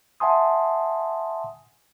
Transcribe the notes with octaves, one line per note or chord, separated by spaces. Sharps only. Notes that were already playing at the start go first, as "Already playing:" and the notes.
E5 F#5 G#5 A5 C6 D#6